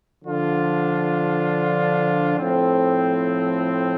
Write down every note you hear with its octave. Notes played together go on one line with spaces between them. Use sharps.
D3 F3 D4 F4
A2 F3 C4 A4